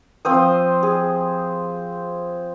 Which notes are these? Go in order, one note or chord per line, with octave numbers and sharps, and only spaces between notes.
F3 C4 C5 D#6
G#4